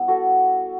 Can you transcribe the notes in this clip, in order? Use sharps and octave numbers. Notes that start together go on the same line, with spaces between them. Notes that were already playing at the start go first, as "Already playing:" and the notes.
Already playing: G3 B3 E4
F#4 A4